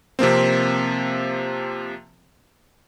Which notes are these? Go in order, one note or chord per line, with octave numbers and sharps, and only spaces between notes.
C3 F3 A#3 C4